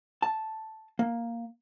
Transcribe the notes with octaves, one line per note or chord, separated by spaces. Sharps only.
A5
A#3